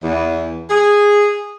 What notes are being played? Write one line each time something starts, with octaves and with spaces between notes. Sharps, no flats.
E2
G#4